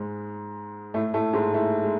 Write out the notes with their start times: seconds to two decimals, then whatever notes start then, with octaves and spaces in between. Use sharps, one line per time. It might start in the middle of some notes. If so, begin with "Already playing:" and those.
Already playing: G#2 G#3
0.94 A2 A3
1.14 A2 A3
1.33 G#2 G#3
1.54 A2 A3
1.84 G#3